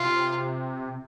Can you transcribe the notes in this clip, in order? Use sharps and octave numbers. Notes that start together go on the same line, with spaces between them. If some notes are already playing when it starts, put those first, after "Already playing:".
Already playing: C3 F4